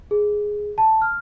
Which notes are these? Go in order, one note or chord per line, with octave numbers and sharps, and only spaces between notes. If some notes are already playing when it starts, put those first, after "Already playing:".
G#4
A5
F6